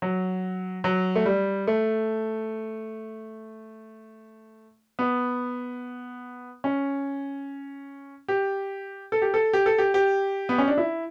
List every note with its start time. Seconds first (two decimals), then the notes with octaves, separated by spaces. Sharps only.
0.02 F#3
0.84 F#3
1.15 A3
1.26 G3
1.67 A3
4.99 B3
6.64 C#4
8.28 G4
9.12 A4
9.22 G4
9.34 A4
9.53 G4
9.66 A4
9.78 G4
9.94 G4
10.49 B3
10.58 C#4
10.68 D4
10.77 E4